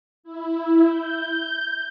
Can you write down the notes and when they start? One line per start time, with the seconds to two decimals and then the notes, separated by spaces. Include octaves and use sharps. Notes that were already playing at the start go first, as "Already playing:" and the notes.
0.24 E4
0.87 G6